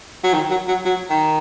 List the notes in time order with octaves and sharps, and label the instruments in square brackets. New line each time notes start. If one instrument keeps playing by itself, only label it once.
[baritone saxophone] F#3
D#3
F#3
F#3
F#3
D#3